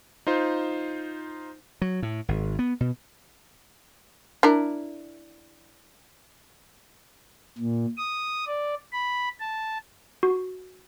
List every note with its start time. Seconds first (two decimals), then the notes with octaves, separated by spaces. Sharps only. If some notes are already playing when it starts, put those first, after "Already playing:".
0.27 D#4 F4 C5
1.82 F#3
2.03 A2
2.28 G#1
2.59 B3
2.80 B2
4.43 D4 E4 A#4
7.58 A#2
7.97 D#6
8.47 D5
8.92 B5
9.40 A5
10.23 F#4